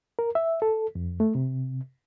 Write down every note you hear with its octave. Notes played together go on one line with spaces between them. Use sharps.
A#4
E5
A4
F2
A3
C3